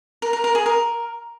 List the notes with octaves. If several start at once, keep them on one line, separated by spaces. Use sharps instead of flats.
A#4
A#4
A#4
G#4
A#4